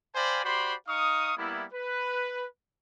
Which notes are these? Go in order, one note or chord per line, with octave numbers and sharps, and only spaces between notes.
C5 D5 F5 G5 G#5 B5
F#4 G4 C5 D5 B5 C6
D#4 F5 C#6 D#6
G3 A#3 B3 E4
B4